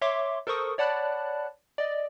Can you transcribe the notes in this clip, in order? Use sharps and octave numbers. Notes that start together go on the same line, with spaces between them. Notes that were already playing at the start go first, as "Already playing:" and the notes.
C#5 E5 C6 D6
A4 A#4 C5 C#6 D#6
C#5 D5 F#5 A5 B5 F#6
D5 D#5